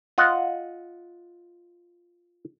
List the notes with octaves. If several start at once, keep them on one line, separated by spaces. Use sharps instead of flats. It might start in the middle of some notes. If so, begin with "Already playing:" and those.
F4 D#5 F#5